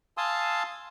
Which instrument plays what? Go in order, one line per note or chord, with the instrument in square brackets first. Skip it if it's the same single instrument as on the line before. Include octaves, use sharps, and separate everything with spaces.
[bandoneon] F5 G#5 A5 C6 D#6 E6